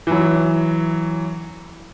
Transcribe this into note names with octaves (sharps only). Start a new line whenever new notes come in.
E3 F#3